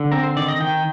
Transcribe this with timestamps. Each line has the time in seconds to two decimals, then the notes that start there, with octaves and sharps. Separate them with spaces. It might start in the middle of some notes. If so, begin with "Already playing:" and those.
Already playing: D3
0.12 C4 A#4
0.24 C5
0.37 D#3 D5
0.48 D#5
0.61 D#3 G5